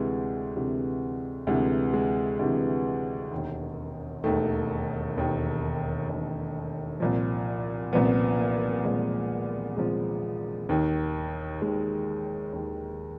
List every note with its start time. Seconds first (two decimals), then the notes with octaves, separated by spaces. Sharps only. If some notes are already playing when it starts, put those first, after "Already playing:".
Already playing: D2 C3 E3 G#3
0.56 D2 C3 E3
1.47 D2 C3 E3 G#3
1.93 G#3
2.39 D2 C3 E3
3.32 E1 D#2 D#3
4.24 E1 D#2 D#3 A3
5.16 E1 D#2 D#3
6.08 E1 D#2 D#3
7.00 C2 A#2 F3
7.93 C2 A#2 F3 B3
8.39 A#3
8.85 C2 A#2 F3 G#3
9.77 C2 A#2 F3 G#3
10.69 D#2 D#3
11.62 D#2 D#3 G#3
12.53 D#2 D#3